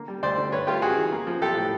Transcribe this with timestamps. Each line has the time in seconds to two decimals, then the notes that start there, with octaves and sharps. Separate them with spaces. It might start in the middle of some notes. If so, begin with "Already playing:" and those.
Already playing: D3 A#3
0.08 G3
0.23 D2 C5 D5
0.38 D3
0.52 G2 B4 C#5
0.67 A3 F4 G4
0.82 G2 F#4 G#4
0.97 E3
1.12 A#3
1.27 F3
1.42 B1 G4 A4
1.57 A2